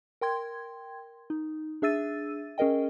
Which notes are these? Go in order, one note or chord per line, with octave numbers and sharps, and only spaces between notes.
A#4 G5 C6 G#6
D#4
D4 G#4 E5 E6 A6 D#7
C#4 G#4 A#4 D#5 G5